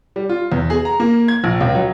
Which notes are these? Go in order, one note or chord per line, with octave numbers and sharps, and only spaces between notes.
G3
F4
E2
G#4
A#5
A#3
G#6
A#1
C#2
F#3